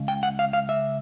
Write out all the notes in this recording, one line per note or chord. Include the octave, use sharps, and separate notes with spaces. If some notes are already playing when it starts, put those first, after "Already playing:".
Already playing: C#2 C#3
G5
F#5
F5
F5
E5